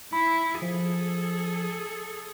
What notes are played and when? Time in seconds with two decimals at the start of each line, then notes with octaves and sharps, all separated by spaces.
0.13 E4 B5
0.62 F3 G#4 A4